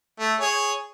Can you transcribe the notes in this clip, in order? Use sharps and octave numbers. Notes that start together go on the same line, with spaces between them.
A3
G#4 C#5